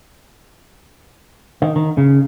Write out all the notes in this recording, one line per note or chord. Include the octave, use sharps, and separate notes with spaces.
D#3
D#3
C#3